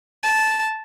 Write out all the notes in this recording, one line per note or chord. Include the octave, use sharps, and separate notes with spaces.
A5